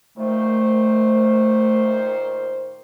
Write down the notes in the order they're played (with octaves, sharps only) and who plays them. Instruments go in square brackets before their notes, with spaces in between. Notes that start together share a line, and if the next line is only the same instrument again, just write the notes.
[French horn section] A#2 D#3 C5 [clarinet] A3